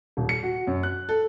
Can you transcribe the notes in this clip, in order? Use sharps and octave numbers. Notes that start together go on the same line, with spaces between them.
D#1
C#7
F#4
F#2
F#6
A4